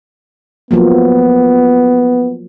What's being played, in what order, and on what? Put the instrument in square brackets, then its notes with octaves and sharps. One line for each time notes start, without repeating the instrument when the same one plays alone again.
[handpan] F3 F#3 A#3 [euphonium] B3